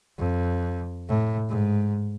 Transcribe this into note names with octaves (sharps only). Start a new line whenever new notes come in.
F2
A2
G#2